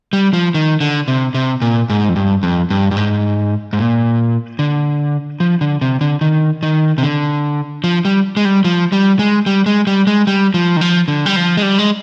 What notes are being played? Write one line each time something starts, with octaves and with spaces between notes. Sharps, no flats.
G3
F3
D#3
D3
C3
C3
A#2
G#2
F2
G2
F2
G2
G2
G#2
G#2
A#2
D3
F3
D3
C3
D3
D#3
D#3
C3
D3
F3
G3
G#3
G3
F3
G3
G#3
G3
G#3
G3
G#3
G3
F3
D#3
F3
D3
G3
F3
G#3
G3
G#3